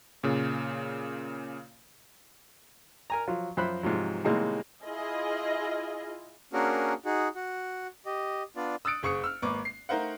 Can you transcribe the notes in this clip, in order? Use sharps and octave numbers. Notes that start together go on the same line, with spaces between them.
A#2 C#3
A#4 G#5 A#5
F3 F#3 F4
F#2 F3 C5 E5 B5 F#6
G#2 C3 F3 F#3
A2 C3 D#3 G3 G#3 A#3
E4 F4 G#4 D#5
A#3 C#4 D4 F#4 G#4 A#4
D#4 F#4 G#4
F#4
G4 D#5
B3 D4 F4 D5
D#6 E6 F#6 A6 C#7 D7
F#1 G#4 C#6 D#6 C#7
E6 F6
G#1 A#3 B4 C#6 D6
C7
A3 D#4 A#4 C5 F5 F#5